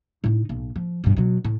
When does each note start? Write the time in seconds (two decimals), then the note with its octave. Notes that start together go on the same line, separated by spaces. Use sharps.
0.24 A2 D#4
0.49 B1
0.76 F3
1.04 G2 B2
1.17 B2 F#3
1.44 A2